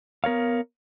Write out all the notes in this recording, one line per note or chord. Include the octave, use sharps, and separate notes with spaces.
B3 A#4 C#5 F5